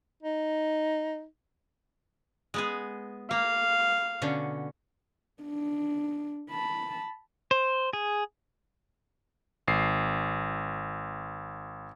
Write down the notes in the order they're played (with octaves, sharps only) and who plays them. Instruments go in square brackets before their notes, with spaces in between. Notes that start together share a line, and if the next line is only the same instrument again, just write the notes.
[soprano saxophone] D#4
[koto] G#3 B3 G#4
[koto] A#3 [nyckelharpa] F5
[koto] B2 D3 C#4
[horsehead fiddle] D4
A5 B5
[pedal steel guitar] C5
G#4
[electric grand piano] G#1 C7